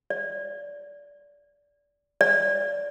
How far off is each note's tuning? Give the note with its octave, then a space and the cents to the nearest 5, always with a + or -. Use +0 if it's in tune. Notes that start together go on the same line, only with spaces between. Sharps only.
D5 -20
D5 -20